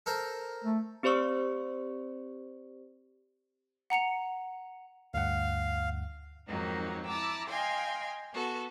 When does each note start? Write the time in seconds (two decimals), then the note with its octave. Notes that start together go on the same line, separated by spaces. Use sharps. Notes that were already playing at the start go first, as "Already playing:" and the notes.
0.06 A4 A#4 C5
0.64 A3
1.03 C4 G4 C5 D5 C#6 E6
3.90 F#5 A#5 C#7 F7
5.14 D2 G2 F5 F#5
6.47 F2 G#2 D#3 F#3 A#3 D#4
7.07 E4 A5 A#5 D6 E6
7.48 D#5 F5 G5 G#5 C6
8.33 B3 F#4 A4